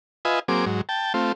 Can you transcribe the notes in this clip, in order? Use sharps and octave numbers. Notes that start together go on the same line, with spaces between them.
F4 B4 D#5 E5 G#5
F#3 A#3 C4 G#4 D6
G#2 F#3
G5 A5
A3 C4 F4